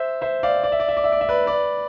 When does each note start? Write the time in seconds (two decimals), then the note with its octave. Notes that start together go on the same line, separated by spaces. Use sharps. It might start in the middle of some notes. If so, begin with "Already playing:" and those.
Already playing: C5 E5
0.21 C5 E5
0.43 D5 F5
0.64 D5
0.72 E5
0.80 D5
0.89 E5
0.97 D5
1.04 E5
1.12 D5
1.21 E5
1.29 B4 D5
1.46 B4 D5